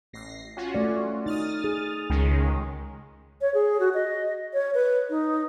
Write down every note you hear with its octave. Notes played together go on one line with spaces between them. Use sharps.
A1 A#6 C7
C#4 F4 F#4
A3 D5
D#4 D#6 F6 A6
G#4
C#2 D#3 G#3 C#4
C#5
G#4
F#4
D#5
C#5
B4
D#4